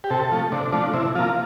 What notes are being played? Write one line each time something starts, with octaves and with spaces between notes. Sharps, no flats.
G4
C3 A4
F3 A3
C3 D4
F3 A3 D4
C3 E4
F3 A#3 F4